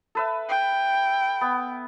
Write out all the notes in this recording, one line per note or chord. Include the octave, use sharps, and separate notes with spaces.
A4 B4 E5
G5
B3